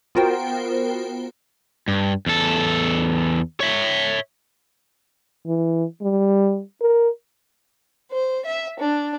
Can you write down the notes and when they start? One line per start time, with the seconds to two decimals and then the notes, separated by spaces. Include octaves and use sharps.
0.15 B3 F4 F#4 A#4 C5 G5
1.88 G2
2.26 E2 A4
3.60 C#5 E5
5.46 E3
6.02 G3
6.82 A#4
8.11 C5
8.45 E5
8.78 D4